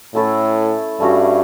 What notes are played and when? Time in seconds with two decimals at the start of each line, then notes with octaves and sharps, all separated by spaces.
0.14 A2 A3 C#4 E4 A4
1.00 G2 A3 C#4 F#4